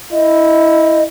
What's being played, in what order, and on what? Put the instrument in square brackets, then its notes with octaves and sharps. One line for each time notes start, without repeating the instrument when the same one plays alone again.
[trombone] E4 [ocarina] D#5